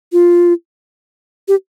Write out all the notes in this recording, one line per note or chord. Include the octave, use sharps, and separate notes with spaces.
F4
G4